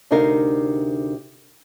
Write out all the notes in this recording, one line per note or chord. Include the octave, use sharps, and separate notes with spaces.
D2 C3 D4 D#4 A#4 F5